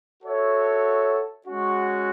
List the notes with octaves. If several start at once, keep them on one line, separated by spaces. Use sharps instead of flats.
F#4 A4 C#5 E5
G#3 C#4 F#4